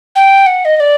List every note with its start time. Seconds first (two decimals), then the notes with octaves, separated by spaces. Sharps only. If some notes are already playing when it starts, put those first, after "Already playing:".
0.16 G5
0.46 F#5
0.65 D#5
0.77 D#5
0.80 D5